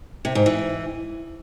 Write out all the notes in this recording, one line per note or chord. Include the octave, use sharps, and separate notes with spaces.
C3
G#2
E3